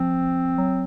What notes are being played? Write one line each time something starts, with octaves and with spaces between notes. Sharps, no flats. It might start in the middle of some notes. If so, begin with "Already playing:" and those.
Already playing: F3 C4
F#3